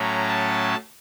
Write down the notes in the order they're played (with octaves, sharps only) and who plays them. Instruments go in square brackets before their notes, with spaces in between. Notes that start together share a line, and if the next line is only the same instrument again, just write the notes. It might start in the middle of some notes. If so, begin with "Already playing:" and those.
Already playing: [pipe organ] A2 F#3 A3 C#4 A#5
A5